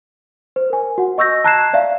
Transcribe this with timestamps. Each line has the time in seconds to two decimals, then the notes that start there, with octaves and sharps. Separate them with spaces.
0.56 C5
0.70 A#4 G#5
0.98 F#4 F#5
1.18 D#5 C#6 E6 G6 A#6
1.44 A5 A#5 F#6 G#6 C7 E7
1.73 D5 E5 F5